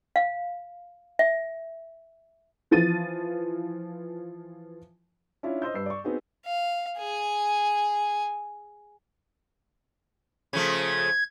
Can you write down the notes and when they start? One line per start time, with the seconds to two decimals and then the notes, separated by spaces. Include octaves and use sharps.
0.16 F5
1.19 E5
2.71 E3 F3 A6 D#7
5.43 C#4 D4 E4 F4
5.62 C5 D#5 C6 E6 G6
5.74 G2 B4 E6 C7
5.86 D5 C#6
6.04 B3 C4 D#4 F#4 G#4
6.45 F5
6.98 G#4 G#5
10.53 C#3 F3 A3 G#6